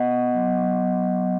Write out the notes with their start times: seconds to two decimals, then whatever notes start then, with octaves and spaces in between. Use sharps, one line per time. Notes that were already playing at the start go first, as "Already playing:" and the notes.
Already playing: B3 D#5 F#5
0.11 B3
0.34 F#3
0.57 F#3
0.80 F#3
1.03 F#3